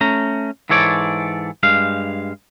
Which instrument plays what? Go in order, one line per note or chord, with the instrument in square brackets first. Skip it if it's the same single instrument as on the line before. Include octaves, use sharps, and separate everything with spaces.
[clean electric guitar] A3 C#4 A#5
G#2 E3 A4 C#5 D5
G2 G#3 F5